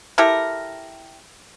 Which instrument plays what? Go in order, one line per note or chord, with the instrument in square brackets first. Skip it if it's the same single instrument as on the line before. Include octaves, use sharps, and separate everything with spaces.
[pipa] E4 G4 A4 A#4